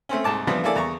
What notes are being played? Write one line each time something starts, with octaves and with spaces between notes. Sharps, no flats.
A3 C4 C#4
C2 G#2 A5 D6
E3 F3 G3 B3 D4
A#3 E4 G#4 A4 D5
E2 A#5 C#6